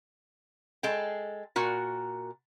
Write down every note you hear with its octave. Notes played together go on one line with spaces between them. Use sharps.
G#3 A4 G5
A#2 F#4 A#4